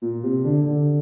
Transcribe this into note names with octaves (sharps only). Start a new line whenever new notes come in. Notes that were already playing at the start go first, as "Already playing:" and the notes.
A#2
C3
D3
D3